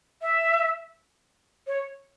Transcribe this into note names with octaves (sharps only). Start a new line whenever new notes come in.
E5
C#5